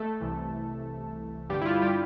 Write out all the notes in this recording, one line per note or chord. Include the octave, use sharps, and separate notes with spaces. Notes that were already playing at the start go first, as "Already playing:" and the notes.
Already playing: A3 A4
C2 C3 E3
G2 D3 G3 G4
E4
F4
G3 G4